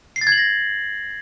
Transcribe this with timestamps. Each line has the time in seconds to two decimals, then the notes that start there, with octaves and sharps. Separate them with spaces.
0.16 C7
0.21 A6
0.27 G#6
0.32 F#7
0.38 A#6